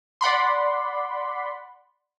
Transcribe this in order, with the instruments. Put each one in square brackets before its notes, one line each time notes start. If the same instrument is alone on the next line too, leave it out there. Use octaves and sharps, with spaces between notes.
[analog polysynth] D5 F#5 B5 C6